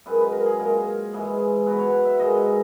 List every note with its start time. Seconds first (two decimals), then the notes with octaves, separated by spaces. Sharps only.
0.06 F#2 D#3 G#3 B4
0.20 B4
0.33 A#4
0.46 G#4
0.60 A#2 G#3 A#4
1.13 G#2 E3 G#3
1.66 B2 F#3 B4
1.79 C#5
1.92 F#5
2.05 E5
2.18 G#2 D#3 G#3 D#5